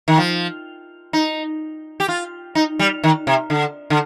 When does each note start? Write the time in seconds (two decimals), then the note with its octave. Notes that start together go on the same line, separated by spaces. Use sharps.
0.08 D#3
0.18 F3
1.13 D#4
2.00 G4
2.08 F4
2.55 D#4
2.79 G3
3.04 D#3
3.27 C3
3.50 D3
3.90 D3